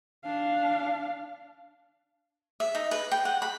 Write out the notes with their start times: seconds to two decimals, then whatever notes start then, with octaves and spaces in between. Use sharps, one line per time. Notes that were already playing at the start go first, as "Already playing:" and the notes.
0.24 D4 F5
2.60 E5
2.75 D#4
2.91 B4
3.12 G5
3.25 F#5
3.42 B5